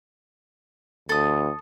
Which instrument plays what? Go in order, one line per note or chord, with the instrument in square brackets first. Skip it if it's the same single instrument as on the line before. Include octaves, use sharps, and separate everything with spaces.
[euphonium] D2 [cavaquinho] A4 D#6